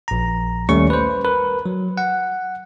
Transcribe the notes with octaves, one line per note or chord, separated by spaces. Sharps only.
A#1 A#5
D#2 G3 A3 C#4 C#6
B4 C5
A#4 B4
F#3
F#5